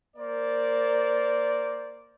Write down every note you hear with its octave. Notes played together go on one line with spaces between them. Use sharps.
A#3 A#4 C5 D5